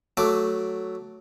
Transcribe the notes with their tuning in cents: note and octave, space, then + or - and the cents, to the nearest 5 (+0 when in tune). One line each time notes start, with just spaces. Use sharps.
F#3 +0 A3 +0 D6 +0